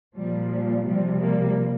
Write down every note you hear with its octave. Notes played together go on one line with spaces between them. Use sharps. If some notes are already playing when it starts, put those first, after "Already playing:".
A#2 F3 G3
G3
C3 F3 G3
G3 A#3